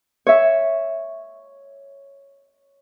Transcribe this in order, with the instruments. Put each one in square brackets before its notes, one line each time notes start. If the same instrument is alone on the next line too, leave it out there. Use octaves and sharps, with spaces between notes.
[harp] C#5 E5